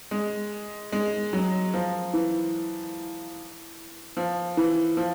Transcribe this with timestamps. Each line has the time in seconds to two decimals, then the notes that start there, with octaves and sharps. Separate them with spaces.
0.11 G#3
0.92 G#3
1.33 F#3
1.74 F3
2.13 E3
4.17 F3
4.57 E3
4.97 F3